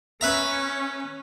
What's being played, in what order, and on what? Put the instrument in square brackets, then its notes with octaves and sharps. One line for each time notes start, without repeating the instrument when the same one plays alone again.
[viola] C#4 [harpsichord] B4 E5 A#5